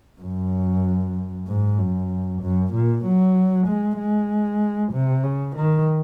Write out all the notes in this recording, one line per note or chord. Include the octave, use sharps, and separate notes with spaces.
F#2
G#2
F#2
F#2
A#2
F#3
G#3
G#3
C3
C#3
D#3